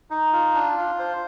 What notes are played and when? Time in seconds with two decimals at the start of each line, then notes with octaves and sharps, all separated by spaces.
0.10 D#4
0.33 F4
0.55 D4
0.77 F4
0.99 C5